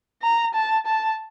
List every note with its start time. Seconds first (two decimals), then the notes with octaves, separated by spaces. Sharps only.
0.23 A#5
0.54 A5
0.86 A5